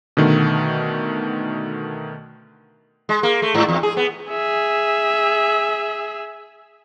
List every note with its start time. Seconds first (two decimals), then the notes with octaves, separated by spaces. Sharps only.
0.17 B2 D3 D#3 A3
3.09 G#3
3.23 A#3
3.42 A3
3.55 G#2
3.68 E2
3.83 G#4
3.97 B3
4.31 G#4 E5